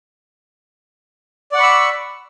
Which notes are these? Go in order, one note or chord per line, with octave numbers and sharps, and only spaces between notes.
D5 F#5 B5 C#6 E6